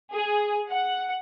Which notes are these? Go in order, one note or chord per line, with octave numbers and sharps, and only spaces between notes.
G#4
F#5